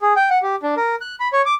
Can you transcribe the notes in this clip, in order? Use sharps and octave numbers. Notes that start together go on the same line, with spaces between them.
G#4
G5
F#5
G4
D4
A#4
F#6
B5
C#5
D6